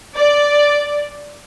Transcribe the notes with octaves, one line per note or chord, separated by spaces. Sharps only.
D5